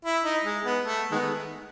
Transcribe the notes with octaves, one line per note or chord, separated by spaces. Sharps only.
E4
D#4
G#3
B3
A3
D#3 G#3 B3